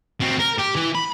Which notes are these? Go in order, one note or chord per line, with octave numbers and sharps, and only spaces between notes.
F#3 C4
A#4
G4
E3
B5